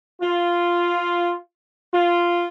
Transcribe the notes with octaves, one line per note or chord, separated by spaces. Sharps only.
F4
F4